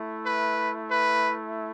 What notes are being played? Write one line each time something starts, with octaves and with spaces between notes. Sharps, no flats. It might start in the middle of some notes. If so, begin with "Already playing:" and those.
Already playing: A3 E4
B4
B4